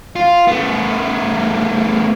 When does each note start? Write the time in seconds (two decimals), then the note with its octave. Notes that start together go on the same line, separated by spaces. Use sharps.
0.16 F4
0.47 A3 B3